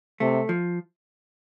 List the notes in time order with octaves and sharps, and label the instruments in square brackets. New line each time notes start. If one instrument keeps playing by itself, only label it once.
[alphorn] C3 [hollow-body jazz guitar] A3
[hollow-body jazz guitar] F3